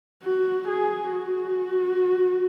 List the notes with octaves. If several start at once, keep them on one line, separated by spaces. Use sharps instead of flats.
F#4
G#4
F#4